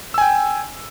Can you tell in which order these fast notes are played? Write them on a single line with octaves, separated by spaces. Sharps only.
E6 G#5 G5